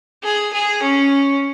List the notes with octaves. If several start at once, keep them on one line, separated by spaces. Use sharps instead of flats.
G#4
G#4
C#4